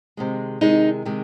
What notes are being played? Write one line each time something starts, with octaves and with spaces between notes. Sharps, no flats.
C3 D#3 G#3
C3 D#3 G#3 D#4
C3 D#3 G#3